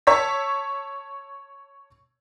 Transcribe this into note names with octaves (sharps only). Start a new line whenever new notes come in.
C#5 A5 C#6 E6 B6